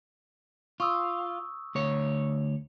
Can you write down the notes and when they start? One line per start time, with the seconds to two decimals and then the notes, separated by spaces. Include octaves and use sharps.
0.80 F4 C#6 D#6 E6
1.75 D2 C#5